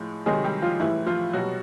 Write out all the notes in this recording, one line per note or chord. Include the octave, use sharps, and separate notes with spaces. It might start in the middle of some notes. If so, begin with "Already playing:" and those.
Already playing: A2 F3 G#3
C3 D#3 F#3 G#3 G#4
G3 G4
F3 F4
A2 E3 G3 E4
F3 F4
B2 F#3 G3 F#4